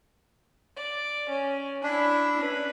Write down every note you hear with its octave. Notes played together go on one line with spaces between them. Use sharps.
D5
C#4
D4 E4 B5
C#4 B4